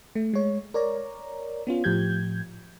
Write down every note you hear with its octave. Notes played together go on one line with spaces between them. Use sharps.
A3
G#3 C#5
A#4 C#5 D5 A#5
B3 C#4 F4
A2 F3 G4 G6 G#6